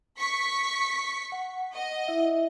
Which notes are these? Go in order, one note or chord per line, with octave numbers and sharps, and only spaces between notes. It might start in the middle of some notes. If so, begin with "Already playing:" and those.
C#6 B6
F#5
D#5
E4 E5